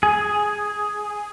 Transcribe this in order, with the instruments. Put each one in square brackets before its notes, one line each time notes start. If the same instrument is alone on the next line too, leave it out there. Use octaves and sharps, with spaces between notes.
[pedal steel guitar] G#4